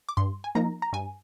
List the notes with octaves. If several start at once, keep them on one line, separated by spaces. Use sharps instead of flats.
D6
G2 C6
G#5
F3 A#3 D#4 A#5
A#5
G2 G#5